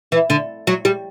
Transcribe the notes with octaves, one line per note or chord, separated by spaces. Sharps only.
E3
D3
F#3
G3